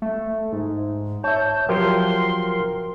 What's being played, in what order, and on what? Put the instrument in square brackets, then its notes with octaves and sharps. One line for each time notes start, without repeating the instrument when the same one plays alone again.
[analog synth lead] A3
G#2
[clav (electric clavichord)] C#5 E5 [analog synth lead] A5 [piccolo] G6
[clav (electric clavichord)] F3 F#3 G4 [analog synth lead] A#4 [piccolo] C6